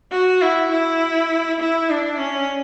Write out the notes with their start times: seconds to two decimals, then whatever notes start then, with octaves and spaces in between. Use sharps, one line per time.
0.12 F#4
0.42 E4
0.71 E4
1.60 E4
1.90 D4
2.19 C#4